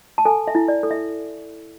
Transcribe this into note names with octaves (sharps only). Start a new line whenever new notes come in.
A5
A4 G#5
E5
E4
D5
A4
E5